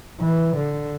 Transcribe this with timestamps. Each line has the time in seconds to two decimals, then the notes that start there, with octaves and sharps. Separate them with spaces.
0.21 E3
0.56 D3